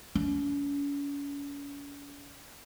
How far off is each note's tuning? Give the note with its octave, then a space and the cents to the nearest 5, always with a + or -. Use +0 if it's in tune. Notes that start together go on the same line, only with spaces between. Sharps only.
C#4 +40